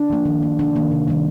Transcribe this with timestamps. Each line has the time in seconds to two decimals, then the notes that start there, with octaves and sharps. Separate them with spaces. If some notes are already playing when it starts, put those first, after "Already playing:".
Already playing: D4
0.10 F3 A#3
0.25 D#3
0.43 A#3
0.59 C3 D4
0.76 D#3 A#3
0.91 C3
1.08 D#3 G3 A#3